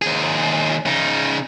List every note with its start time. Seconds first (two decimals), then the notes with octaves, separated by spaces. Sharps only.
0.02 D#2 G#4
0.86 C#3 D#4